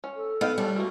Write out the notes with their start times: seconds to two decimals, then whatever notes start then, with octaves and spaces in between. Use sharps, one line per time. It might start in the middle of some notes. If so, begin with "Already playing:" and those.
0.04 C#4
0.16 A4
0.41 B3 D#4 F5 G5
0.58 G3 C#5 A5
0.76 A3 A#3 F#4